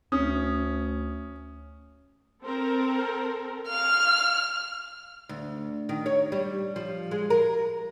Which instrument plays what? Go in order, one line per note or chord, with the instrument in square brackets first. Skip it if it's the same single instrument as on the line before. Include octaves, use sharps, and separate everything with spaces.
[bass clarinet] D2 [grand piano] C#4 [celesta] D#6
[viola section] C4 A4 A#4
[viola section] F5 [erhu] F6
[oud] D2
D#3
C#5
G3
F3
G#3
A#4